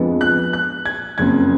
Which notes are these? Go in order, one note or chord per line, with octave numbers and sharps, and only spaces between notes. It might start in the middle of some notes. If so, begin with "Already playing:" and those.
Already playing: F2 F3 G#3 B3 D4
F#6
F#6
G#6
F#1 F2 C#3 G#6